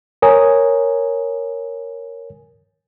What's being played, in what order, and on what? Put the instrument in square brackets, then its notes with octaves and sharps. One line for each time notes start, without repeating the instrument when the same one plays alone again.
[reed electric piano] A#4 C#5 G#5 D#6